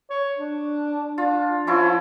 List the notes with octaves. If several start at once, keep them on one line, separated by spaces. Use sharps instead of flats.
C#5
D4
D4 F4
F3 C#4 E4 F4